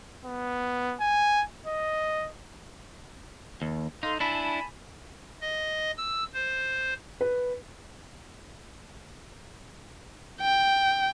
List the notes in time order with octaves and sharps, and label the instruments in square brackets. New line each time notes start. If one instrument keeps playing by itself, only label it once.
[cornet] B3
G#5
D#5
[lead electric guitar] D#2
[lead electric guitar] D#4 [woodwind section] A4 F5 C6
[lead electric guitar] D4 E4 [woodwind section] G#5 A5 B5
[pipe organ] D#5
E6
C5
[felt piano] B4
[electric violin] G5